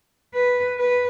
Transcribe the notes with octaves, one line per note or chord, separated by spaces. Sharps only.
B4
B4